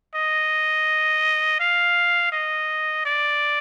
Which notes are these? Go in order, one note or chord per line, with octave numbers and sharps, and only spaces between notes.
D#5
F5
D#5
D5